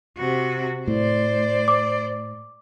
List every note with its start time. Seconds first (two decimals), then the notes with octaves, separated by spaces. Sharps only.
0.17 C3 F#4
0.87 A2 C5 D5
1.68 D6